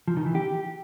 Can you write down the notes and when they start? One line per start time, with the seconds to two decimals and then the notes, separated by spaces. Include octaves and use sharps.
0.08 F3
0.17 D#3
0.26 E3
0.35 G4